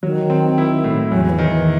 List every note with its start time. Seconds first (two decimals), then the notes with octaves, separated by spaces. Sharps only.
0.03 D#3 F#3
0.30 C4
0.58 E4
0.84 A2
1.11 E2 F#3
1.24 F#3
1.30 E3
1.38 D#3
1.48 E3